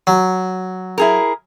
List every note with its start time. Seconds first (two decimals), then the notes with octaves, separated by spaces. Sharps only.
0.07 F#3
0.98 E4 G#4 A#4